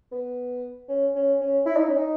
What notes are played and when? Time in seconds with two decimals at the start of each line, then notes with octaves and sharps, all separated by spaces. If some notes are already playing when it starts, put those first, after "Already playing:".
0.12 B3
0.89 C#4
1.16 C#4
1.41 C#4
1.66 E4
1.77 D#4
1.87 C#4
1.97 D#4